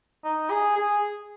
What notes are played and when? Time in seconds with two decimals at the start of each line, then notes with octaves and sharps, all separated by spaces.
0.24 D#4
0.51 G#4
0.78 G#4